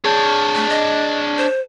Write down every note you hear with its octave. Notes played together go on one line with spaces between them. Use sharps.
D4 G#4 C#5 A5 G6
A3
D#5
C5